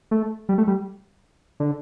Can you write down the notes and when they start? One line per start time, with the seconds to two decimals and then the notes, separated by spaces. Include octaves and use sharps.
0.11 A3
0.49 G3
0.58 A3
0.67 G3
1.60 D3